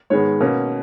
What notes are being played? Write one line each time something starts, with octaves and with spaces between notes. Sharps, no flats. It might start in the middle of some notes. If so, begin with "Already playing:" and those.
G#2 D#3 G#3 B3 C#5
B2 A#3 C#4